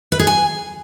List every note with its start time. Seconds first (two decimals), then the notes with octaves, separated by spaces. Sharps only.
0.12 B4
0.19 G#4
0.27 G#5